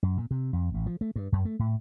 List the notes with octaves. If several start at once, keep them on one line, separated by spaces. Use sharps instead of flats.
F#2
A#2
C3
F2
A1
F3
A3
G2
F#2
A3
A2